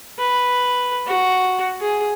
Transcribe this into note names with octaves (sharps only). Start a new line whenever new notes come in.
B4
F#4
G#4